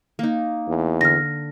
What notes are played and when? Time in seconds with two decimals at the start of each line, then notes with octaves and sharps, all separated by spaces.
0.19 A#3 D#4
0.68 E2
1.01 D3 F6 A#6